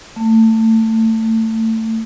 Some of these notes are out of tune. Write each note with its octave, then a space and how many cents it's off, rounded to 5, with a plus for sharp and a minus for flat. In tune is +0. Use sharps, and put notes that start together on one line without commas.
A3 +25